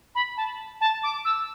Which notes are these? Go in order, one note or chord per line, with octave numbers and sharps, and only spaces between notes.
B5
A5
A5
D6
E6